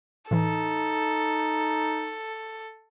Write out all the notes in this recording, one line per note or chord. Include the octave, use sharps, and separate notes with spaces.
A2 E3 D#4 A4